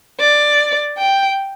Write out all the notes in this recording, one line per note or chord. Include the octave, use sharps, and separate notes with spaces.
D5
G5